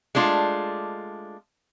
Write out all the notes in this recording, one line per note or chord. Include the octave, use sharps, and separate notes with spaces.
G#3 A3 D4 F4